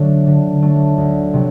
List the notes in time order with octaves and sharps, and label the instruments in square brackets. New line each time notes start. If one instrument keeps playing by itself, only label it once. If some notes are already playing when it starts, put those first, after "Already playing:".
Already playing: [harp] D3 F#3 A3 D4
D3
F#3 A3 D4
D2
C3 F#3